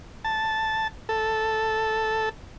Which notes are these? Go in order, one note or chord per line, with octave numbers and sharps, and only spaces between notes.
A5
A4